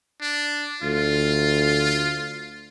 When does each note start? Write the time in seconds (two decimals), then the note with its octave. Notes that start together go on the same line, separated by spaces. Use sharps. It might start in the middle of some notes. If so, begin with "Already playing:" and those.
0.21 D4
0.82 D2 F4